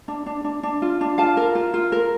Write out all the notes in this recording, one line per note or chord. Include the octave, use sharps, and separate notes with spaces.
D4
D4
D4
D4
F4
D4
F4 F5 A5
A#4
F4
F4
A#4